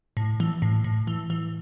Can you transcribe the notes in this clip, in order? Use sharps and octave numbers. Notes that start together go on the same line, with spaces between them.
A2
E3
A2
A2
E3
E3